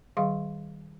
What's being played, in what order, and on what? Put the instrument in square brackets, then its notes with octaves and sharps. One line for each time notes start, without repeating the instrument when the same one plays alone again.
[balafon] D#3 G3 G#4 E5 F5 C6